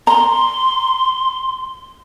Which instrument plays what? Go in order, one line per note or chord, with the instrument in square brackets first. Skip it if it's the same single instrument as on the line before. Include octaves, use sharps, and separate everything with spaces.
[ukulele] A#5 [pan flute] C6